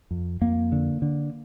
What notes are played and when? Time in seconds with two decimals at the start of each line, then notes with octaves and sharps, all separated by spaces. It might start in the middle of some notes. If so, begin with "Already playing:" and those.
0.11 F2
0.41 F2 A#3
0.72 D3
1.02 D3